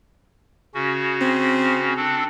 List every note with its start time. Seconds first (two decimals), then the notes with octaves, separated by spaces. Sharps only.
0.74 C#3 C#4 F#4
1.21 C4
1.97 C4 D4 A4